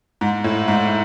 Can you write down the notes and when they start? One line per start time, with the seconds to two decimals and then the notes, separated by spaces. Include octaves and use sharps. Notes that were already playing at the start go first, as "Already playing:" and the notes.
0.21 G#2
0.44 A2
0.68 G#2